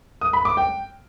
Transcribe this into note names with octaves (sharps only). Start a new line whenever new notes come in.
D#6
B5
D6
G5